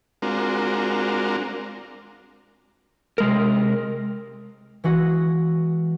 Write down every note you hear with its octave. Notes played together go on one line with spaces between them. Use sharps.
G#3 C4 D4 F4 F#4 A#4
C3 G#3 A#4
E3 G#3 F#4 D#5